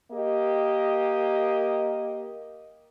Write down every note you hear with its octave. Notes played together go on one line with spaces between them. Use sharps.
A#3 G4 D#5